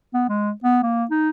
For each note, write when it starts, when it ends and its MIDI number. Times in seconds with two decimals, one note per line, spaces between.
0.14 0.24 59
0.29 0.51 56
0.64 0.80 59
0.83 1.05 58
1.11 1.30 63